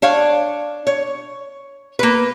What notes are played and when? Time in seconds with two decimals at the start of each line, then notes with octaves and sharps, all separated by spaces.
0.02 D4 C#5 F5
0.87 C#5
1.99 A#3 B4